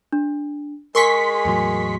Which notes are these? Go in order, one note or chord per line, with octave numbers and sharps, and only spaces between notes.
D4
G#3 G#4 A#4 G#5 C6 C#6 B6
E2 A2 F#3